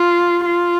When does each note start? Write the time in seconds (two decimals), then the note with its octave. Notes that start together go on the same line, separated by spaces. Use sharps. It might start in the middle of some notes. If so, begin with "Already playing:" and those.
Already playing: F4
0.45 F4